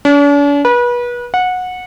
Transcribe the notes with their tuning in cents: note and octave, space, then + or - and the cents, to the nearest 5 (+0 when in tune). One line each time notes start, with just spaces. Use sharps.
D4 -45
B4 -30
F#5 -20